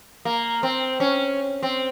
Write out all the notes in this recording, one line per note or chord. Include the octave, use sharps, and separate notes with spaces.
A#3
C4
C#4
C4